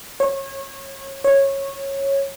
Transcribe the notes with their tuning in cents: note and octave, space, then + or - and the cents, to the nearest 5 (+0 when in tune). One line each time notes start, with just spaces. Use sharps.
C#5 -30
C#5 -15